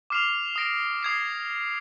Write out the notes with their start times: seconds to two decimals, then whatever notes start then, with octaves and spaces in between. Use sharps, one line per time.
0.10 D6 F6 C7 F7
0.56 D#6 A#6 D7
1.03 D#6 G#6 C7